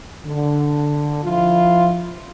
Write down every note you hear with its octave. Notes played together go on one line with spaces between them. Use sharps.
D3
F3 E4 F4